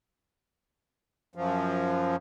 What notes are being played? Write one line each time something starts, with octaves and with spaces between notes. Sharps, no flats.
F#2 F3